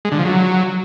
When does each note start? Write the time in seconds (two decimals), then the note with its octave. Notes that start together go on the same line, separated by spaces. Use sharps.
0.05 G#3
0.12 D3
0.18 F3
0.25 F#3